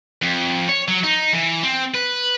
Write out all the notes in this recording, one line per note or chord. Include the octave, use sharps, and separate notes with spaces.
F2
C#5
F#3
D#4
E3
C4
B4